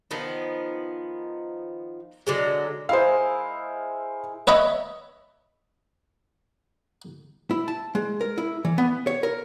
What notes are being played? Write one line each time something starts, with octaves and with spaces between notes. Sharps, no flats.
D#3 F3 B3
D3 F#3 G#3
G#3 E4 A#4 C5 F5
B4 C#5 D#5 E5 B5
E4
A5
G#3
A#4
E4
E3
B3
C#5
A#4